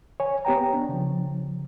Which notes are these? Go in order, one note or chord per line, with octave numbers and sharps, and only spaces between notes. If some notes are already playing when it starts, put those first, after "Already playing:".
C#5 G#5
B3 G4 C#5 G5 A#5
D4
C#3 F3